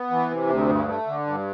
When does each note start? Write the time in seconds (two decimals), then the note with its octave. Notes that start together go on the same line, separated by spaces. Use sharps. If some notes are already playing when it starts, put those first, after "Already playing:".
Already playing: B3
0.11 E3
0.31 C3
0.50 D2
0.69 G2
0.88 A3
1.07 D3
1.27 G2